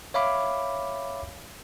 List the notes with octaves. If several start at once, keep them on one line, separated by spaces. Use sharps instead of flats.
C#5 E5 F5 B5 D6